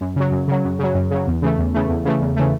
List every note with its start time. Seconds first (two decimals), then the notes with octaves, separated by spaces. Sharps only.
0.01 F#2
0.16 C#3 F#3
0.32 F#2
0.48 C#3 F#3
0.64 F#2
0.79 C#3 F#3
0.95 F#2
1.11 C#3 F#3
1.27 E2
1.42 C#3 E3 A3
1.58 E2
1.74 C#3 E3 A3
1.90 E2
2.05 C#3 E3 A3
2.21 E2
2.36 C#3 E3 A3